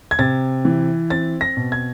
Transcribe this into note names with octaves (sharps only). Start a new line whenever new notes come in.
G#6
C3 A6
E3
C4 A6
A#6
B2
G#6